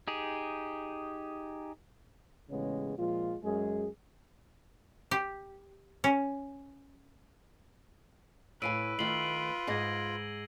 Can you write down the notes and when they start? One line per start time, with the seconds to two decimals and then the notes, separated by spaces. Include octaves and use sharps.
0.08 D#4 G4 G#4
2.50 A1 C#3 G#3 B3 C#4
2.98 A#2 F3 G#3 F4
3.43 F#2 G#3 G#4
5.11 G4
6.04 C#4
8.62 A2 B4 F5 G#5 E6 D7 D#7
8.99 D#3 A3 F4 C7 F#7 G7
9.67 G#2 G#4 D#5 G#6 A#6 C7